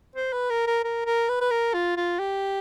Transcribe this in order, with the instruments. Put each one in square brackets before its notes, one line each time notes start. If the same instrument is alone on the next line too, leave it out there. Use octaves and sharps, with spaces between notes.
[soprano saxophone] C5
B4
A#4
A#4
A#4
A#4
B4
B4
A#4
F4
F4
G4